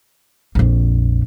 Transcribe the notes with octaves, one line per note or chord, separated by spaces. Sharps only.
A#1 F2